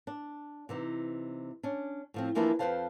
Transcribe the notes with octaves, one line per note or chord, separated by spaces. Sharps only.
D4
C3 E3 D#4
C#4 D4
A2 F3 C4
E3 F3 A#3 D4 E4 B4
F2 G#3 B4 C5 F5 A5